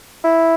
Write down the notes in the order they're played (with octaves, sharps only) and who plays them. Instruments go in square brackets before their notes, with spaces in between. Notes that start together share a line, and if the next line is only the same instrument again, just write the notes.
[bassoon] E4